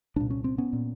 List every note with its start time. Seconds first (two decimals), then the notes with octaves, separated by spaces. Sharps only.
0.16 C2 A#2 D4
0.30 C#4
0.44 C4
0.58 B3 C#4
0.73 A#2